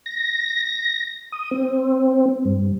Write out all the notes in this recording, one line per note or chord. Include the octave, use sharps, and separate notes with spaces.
A#6
D#6
C4
G2